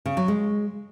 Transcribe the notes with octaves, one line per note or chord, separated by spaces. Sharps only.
C#3
F#3
G#3